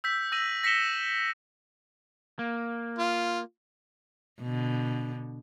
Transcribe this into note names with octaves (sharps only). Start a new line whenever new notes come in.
E6 G6 B6
E6 A#6 D#7 F#7
A#6 B6 C#7 E7 G7
A#3
F4
B2 D3